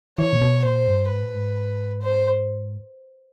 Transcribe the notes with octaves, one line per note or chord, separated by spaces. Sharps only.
E3 C#5
A#2
B2
A#2 C5
G2
G#2 B4
A2
G#2
C5